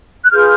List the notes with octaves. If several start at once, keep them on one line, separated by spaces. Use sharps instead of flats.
F#6
F4 G#4 B4 F6 G6